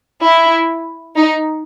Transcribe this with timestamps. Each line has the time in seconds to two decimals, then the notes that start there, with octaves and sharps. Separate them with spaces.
0.23 E4
1.17 D#4